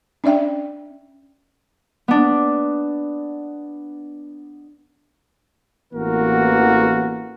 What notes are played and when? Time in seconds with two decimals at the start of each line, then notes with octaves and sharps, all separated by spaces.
0.24 C#4 D4 D5 E5 G5
2.08 B3 D4
5.94 A1 E3 A#3 B3 F#4 A#4